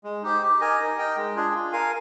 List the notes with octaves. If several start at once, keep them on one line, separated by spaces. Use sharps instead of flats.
G#3
D#4 G4 C5
G4
A#4 D#5 G#5
D#4
A#4 D#5 G5
G#3
D4 F4 G#4
F4
A#4 F5 G#5